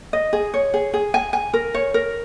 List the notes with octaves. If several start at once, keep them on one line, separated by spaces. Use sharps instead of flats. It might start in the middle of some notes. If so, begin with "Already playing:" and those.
D#5
G#4
C#5
G#4
G#4
G#5
G#5
A#4
C#5
A#4